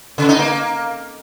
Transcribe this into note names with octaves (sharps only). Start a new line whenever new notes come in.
C#3
D#4
A#3